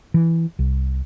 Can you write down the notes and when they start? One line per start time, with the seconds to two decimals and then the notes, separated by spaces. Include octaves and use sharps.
0.14 E3
0.59 C2